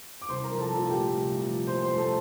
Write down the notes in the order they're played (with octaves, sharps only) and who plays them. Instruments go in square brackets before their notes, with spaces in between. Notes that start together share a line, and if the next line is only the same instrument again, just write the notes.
[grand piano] D6
C2 C5 C6
A#4 A#5
F3
A4 A5
A#2 A4 A5
G4 G5
A3
C2
F3
A#2 C5 C6
C5 C6
A3
A4 A5